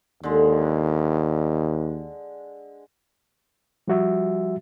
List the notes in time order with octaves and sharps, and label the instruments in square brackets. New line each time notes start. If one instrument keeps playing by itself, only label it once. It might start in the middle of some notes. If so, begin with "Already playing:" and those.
[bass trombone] D#2 [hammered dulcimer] D3 G#3
[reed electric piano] F3 G3 F#4 E5